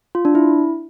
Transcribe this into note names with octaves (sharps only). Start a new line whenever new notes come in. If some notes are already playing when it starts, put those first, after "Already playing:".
F4
D4
E4